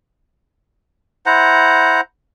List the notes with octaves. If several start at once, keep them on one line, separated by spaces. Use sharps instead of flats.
E4 C5 F#5 A#5